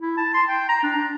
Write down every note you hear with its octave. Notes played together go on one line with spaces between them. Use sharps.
E4
A5
C6
G5
A#5
D4
D4